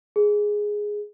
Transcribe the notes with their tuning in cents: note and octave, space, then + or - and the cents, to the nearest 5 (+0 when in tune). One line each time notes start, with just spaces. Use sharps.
G#4 +0